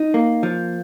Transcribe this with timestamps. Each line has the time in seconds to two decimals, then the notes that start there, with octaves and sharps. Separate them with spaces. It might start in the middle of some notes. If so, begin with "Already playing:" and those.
Already playing: D#4
0.14 A#3
0.43 F3